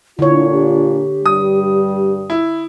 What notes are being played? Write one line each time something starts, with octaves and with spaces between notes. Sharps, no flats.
A#2 D3 D4 E4 F4 C#5
G4
G2 G3 D#6
E4